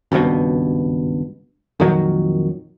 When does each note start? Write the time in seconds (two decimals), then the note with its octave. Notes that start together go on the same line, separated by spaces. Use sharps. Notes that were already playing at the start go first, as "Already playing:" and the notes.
0.12 G#1 C#2 G2 B2
1.80 F2 A#2 D#3 F#3